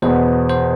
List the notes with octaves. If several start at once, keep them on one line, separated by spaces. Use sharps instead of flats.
E2 B2 B3 C5
C5